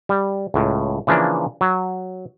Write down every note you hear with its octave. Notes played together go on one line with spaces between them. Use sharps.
G3
C#2 A2
C#3 E3 F3 A#3 D4
F#3